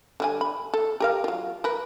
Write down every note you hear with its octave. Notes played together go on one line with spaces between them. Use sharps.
D3 G3 G#5
B5
A4
G4 A#4 F5
F#3 F4
A#4 B4